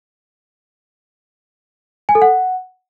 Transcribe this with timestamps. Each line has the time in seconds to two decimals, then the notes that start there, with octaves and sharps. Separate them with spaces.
2.09 G#5
2.15 A4
2.22 F#5